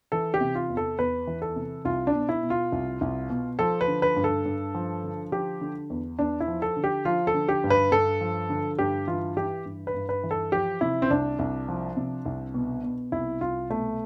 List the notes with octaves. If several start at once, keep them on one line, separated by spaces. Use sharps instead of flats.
E3 A4
G4
C3
F4
E2
A4
E2 B4
E3
A4
C3
C2 F4
D4
B2
E4
B2
F4
C2
C2
B2
F3 A4
B4
D3
B4
G2
A4
G2
F3
D3
F3 G4
D3
E2
E2 D4
E4
F3
A4
D3
G4
F3 F4
A4
D3
G4
G2
B4
G2 A4
F3
D3
G2 G4
E3 F4
E3 G4
G2
B4
G2
B4
E3
A4
F3 G4
C3 E4
C4
C2 D4
C2
F3
C3
C2
B2
B2
C2 E4
C2 F4
B2 A3